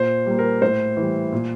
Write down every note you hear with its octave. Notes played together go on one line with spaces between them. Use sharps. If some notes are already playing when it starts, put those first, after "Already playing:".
Already playing: A#2 C5
G3 A#3
A#4
A2 C5
E3 G3
A#2